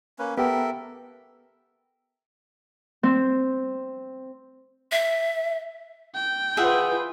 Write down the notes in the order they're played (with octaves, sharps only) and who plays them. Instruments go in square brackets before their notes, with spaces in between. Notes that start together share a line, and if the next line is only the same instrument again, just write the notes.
[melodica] A#3 C#4 B4
[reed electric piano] B3 [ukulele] G4 [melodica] A4 A#4 E5
[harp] C4
[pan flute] E5
[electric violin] G5
[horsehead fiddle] F4 B4 [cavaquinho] G#4 E5 F#5